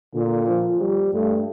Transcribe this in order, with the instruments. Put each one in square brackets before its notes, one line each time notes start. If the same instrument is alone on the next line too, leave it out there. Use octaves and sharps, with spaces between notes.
[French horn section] A#2 [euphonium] D3
[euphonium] F3
G3
[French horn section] G2 [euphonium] A3